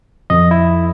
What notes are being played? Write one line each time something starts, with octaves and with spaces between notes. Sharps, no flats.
F2 D#5
E4